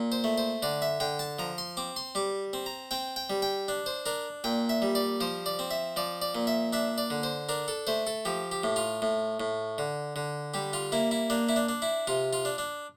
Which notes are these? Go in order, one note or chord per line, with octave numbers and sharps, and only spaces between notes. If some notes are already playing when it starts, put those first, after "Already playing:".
Already playing: A#2
C5
A3
C5
D3 D5
E5
D3 G5
A5
F3 A#5
C6
C4 D6
C6
G3 D6
C4
A#5
C4 G5
G5
G3
G5
D4
C5
D4 A#4
A#2 G5
E5
G3
D5
F3 C5
D5
C4
E5
F3 D5
D5
A#2
E5
D4 E5
D5
D3
C5
D4 A#4
A4
A3 C5
A4
F3 G4
G4
A2
F4
A2
A2
D3
D3
G3 G4
F4
A#3 E4
E4
A#3 D4
E4
D4
D4
E4
C3 F4
F4
D4
D4